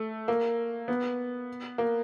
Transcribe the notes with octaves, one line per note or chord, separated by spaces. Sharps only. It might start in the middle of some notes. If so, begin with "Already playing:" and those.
Already playing: A3
A#3
B3
A#3